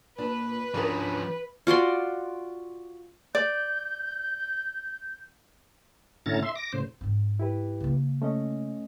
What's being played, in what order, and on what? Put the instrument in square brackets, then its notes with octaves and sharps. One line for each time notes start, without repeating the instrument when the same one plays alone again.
[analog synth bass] A#2 [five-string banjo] D4 [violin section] B4
[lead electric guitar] F3 C#4 [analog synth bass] D4 [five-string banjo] F#4 G#4 A#4
[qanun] F4 F#4 D5 C6
[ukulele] D5 [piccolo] G6
[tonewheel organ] A2 D3 C#4 E4 A#5 A6
E5 C6
D6 A#6
A2 C#3 C5
[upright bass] G#2 C4
[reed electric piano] E4 G4 B4
[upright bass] C#3 A#3
[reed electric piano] A3 C#4 D#5